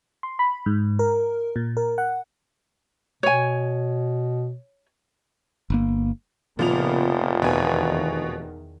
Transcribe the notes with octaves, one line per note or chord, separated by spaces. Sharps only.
C6
B5
G#2
A#4
A#2
A#4
F#5
B2 C#5 G#5
G1 A#3
F1 A#2 C#3 F3 A#3 B3 F7
E2 B2 D#3 G#5